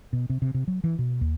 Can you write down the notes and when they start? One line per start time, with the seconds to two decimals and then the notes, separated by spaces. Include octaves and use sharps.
0.13 B2
0.30 C3
0.42 C3
0.54 C3
0.68 F#3
0.84 E3
0.99 B2
1.21 D#2